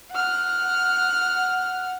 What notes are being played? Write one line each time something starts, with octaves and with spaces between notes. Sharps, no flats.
F#5 F6